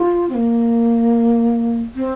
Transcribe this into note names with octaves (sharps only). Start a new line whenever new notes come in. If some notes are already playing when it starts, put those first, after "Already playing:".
Already playing: F4
C4
A#3
C4